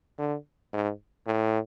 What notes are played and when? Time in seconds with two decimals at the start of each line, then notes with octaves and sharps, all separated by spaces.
0.19 D3
0.73 G#2
1.26 A2